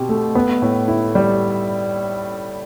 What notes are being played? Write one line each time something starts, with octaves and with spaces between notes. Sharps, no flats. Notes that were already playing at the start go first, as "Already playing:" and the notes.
Already playing: B2 C4 G4
A3
B3
A2
E4
G3